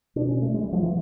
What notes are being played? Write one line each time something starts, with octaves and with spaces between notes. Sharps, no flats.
B2 D4
C#4
A3
G#3
G3
F3
E3